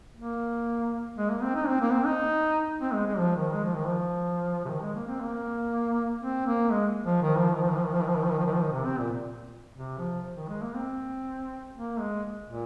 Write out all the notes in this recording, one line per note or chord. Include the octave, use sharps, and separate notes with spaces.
A#3
G#3
A#3
C4
D#4
C4
A#3
C4
D#4
C4
G#3
G#3
F3
D#3
G#3
F3
D#3
F3
C3
D#3
G#3
A#3
C4
A#3
C4
A#3
G#3
F3
D#3
F3
D#3
F3
D#3
F3
D#3
F3
D#3
F3
D#3
F3
D#3
F3
D#3
F3
D#3
C3
C4
A#2
C3
F3
D#3
G#3
A#3
C4
A#3
G#3
A#2